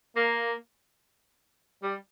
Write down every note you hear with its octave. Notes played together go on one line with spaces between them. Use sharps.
A#3
G3